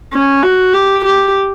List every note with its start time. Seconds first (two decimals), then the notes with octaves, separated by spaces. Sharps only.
0.13 C#4
0.43 F#4
0.74 G4
1.05 G4